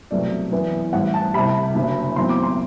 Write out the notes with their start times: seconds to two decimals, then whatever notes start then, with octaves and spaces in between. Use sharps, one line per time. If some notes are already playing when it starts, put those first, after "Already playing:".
0.11 C2 B2 F#3 A3 C4 D5
0.52 F#2 E3 B3
0.93 A1 A2 G3 F#5
1.14 A5
1.34 C2 C3 G3 B5
1.75 F#1 F#2 D3 F#3
2.16 B1 A2 F#3 C4 C6
2.29 D6
2.43 C6